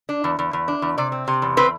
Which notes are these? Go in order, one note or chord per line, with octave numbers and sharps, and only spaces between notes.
D4
E2
E2
E2
D4
E2
C3 D5
C4
C3
E2
C4 B4